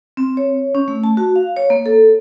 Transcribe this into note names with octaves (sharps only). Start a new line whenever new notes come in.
C4
C#5
C#4
A3
A5
F#4
F5
C#5
A#3
A4